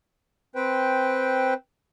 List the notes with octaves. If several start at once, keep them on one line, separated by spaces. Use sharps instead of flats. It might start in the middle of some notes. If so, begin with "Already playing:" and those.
C4 B4 C5 G5